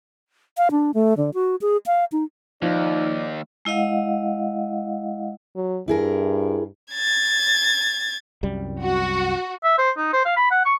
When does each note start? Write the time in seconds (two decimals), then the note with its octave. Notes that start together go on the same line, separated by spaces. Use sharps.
0.57 F5
0.71 D4
0.94 A3
1.17 D3
1.34 F#4
1.61 G#4
1.86 F5
2.12 D#4
2.62 D#2 F3 D#4 D5
3.65 G#3 E4 D#5 F5 F#5
5.56 F#3
5.88 G2 E4 G#4 A#4
6.93 G#6 A6
8.43 C2 F#2 G3
8.83 F#4
9.64 E5
9.79 C5
9.97 D#4
10.13 C5
10.25 F5
10.37 B5
10.51 F#5
10.65 C#6